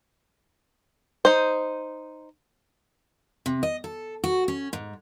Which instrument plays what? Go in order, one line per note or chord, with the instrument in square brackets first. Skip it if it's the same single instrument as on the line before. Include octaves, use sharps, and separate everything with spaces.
[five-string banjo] D#4 C5
[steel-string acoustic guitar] C3
D#5
A4
F#4
C#4
G#2